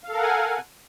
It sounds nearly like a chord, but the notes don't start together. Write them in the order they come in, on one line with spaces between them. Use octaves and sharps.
F5 A4 A#4 F#5 G#5